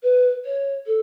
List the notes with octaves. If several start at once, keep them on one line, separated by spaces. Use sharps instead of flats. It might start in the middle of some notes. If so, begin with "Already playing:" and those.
B4
C#5
A4